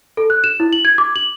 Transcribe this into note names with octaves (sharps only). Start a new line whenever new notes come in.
A4
F#6
E7
E4
F#7
G#6
D6
F#7